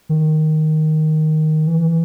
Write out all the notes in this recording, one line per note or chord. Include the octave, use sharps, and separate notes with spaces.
D#3
E3